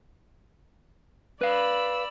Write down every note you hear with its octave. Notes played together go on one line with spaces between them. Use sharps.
B4 D5 F5 B5 E6